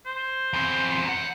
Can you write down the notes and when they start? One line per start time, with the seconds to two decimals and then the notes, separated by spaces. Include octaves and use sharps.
0.06 C5
0.53 E2 C4
1.05 E2 F#5